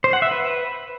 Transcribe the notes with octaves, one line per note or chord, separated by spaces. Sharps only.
C5
F#5
E5
B4